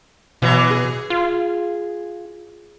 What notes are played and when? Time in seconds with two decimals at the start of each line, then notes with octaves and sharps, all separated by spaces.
0.42 B2 E3 F#3
0.70 G#4
1.10 F4